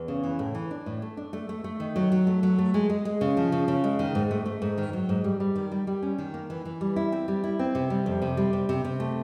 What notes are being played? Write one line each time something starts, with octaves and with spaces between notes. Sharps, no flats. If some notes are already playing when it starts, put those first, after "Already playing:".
Already playing: E2
C#3
E3
A2
E3
D4
A2
A3
D4
A3
A3
A3
D#3
F#3
F#3
A3
F#3
A3
G#3
G#3
G#3
C#3
F3
C#3
C#3
G#3
D#3
G#2
A3
A3
G#2
D#3
F#3
G#2
G3
G3
D#3
G3
G3
C#4
D#3
A#3
E3
E3
G3
E4
C4
G3
E4
C4
C3
G3
F2
C3
G3
C3
C3
C3
A3